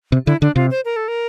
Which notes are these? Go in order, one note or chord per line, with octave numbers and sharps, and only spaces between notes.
C3
D3 E4
D3 D4
C3 F4
C5
A#4
A4
A#4